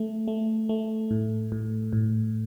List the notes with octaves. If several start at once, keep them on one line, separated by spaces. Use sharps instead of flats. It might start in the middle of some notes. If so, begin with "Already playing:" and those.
Already playing: A3
A3
A3
A2
A2
A2